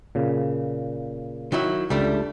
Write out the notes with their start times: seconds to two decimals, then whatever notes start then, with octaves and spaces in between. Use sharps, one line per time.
0.15 A#2 C#3
1.52 D#3 F#3 E4
1.90 C#2 G3 A3 D4